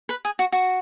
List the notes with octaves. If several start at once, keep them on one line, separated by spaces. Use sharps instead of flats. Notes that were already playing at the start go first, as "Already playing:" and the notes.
B4
G#4
F#4
F#4